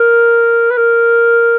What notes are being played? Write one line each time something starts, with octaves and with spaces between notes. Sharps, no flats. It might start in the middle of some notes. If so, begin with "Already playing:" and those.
Already playing: A#4
B4
A#4